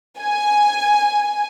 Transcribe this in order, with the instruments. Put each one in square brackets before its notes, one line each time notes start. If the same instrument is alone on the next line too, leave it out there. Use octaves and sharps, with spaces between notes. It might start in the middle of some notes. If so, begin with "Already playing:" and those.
[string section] G#5